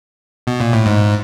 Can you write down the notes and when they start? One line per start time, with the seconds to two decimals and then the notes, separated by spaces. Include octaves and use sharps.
0.47 B2
0.60 A#2
0.73 A2
0.86 G#2